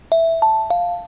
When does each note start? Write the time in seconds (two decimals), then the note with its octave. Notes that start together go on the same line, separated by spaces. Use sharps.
0.12 E5
0.42 A5
0.70 F5